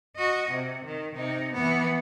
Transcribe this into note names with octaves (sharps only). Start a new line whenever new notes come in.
F#4 D#5
C3
D#3
C3 D#4
E3 B3